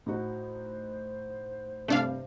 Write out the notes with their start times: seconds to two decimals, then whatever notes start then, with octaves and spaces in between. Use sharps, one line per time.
0.06 A2 D#4 F#4 C5
1.88 G2 C3 A3 D4 F5